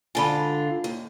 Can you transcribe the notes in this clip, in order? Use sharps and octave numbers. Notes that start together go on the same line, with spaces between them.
G#2 D3 F4 G#5 A5 B5
D#2